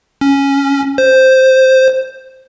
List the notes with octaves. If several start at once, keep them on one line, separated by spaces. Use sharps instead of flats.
C#4
C5